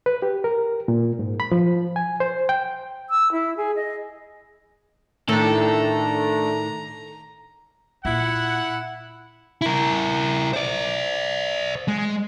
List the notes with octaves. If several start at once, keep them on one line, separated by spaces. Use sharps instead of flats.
B4
G4
A#4
A#2
G#2
B5
F3
G#5
C5
G5
E6
E4
G#4
D#5
A2 D#3 A3 D4 A4 A#5
A#2 E4 F#5
E4 A#4
C5 D5
G#3